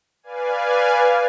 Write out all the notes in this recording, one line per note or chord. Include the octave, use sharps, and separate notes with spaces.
B4 D5 F5 G#5